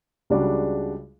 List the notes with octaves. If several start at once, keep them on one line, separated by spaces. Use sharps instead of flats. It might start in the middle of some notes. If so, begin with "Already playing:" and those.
C#2 C#3 G3 D4 F#4